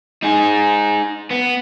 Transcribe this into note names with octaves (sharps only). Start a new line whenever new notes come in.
D#4 G#4
B3